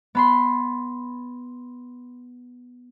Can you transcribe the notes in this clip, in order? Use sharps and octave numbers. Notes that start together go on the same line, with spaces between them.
B3 B5 C6